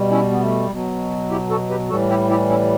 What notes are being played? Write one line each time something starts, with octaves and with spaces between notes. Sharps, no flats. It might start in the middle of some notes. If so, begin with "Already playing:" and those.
Already playing: B2 G3
C#4 E4
B3
A3
B2 F#3
E4 G4
F#4 A4
G4 B4
A2 E3 G3 F#4 A4
E4 G4
E4 G4
C#4 E4